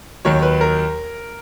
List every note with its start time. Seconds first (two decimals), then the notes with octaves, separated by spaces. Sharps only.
0.25 D#2 D#3 F#3 C#5
0.42 B4
0.61 A#4